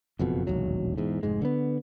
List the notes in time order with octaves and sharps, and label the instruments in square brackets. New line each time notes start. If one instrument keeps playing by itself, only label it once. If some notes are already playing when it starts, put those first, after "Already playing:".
[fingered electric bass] F#1 F2 B2
E1 A#1 D#2 F#3
E1 E2 G#2
F1 G#2 G#3
D3 A#3 B3